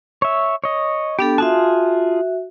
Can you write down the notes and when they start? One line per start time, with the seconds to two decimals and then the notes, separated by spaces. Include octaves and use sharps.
0.22 C#5 E5
0.64 C#5 D#5
1.19 B3 D4 G4 A4
1.38 F4 F#4 G#4 E5 A5